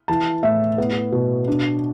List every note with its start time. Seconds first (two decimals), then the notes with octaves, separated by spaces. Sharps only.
0.08 E3 A5
0.43 A2 E5
0.78 B3
1.12 B2
1.48 D4